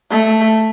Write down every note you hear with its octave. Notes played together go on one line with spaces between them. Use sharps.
A3